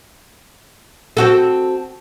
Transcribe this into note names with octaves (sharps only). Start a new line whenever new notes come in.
C4 F#4 A4